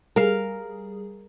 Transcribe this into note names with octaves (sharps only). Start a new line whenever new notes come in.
G3 G#4 A#4 F5